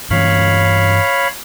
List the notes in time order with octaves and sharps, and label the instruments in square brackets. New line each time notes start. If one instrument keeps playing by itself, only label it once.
[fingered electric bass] G2 E3 C#4 [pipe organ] C#5 F5 B5